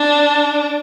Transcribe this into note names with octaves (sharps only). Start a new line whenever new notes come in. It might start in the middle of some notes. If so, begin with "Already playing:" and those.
Already playing: D4